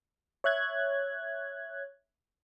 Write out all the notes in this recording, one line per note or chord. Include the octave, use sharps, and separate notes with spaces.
C#5 E5 F#6 G#6